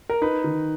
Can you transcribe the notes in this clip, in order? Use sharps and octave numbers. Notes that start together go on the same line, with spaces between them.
A#4
D#4 B4
D#3